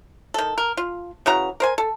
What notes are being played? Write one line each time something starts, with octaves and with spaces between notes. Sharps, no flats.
D#3 A4
A#4
F4
C#3 E3 F#4 A#5
A#4 C5 G#5
A4